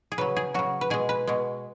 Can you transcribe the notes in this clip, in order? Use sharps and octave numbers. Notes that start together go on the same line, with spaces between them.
G#4
C#3 F#3 B4
G#4
C#3 F#3 F#4
B4
B2 G#3 G#4
B4
B2 G#3